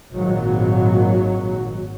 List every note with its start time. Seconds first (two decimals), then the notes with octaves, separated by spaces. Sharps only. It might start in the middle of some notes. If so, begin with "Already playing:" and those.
0.14 G#1 A#2 F#3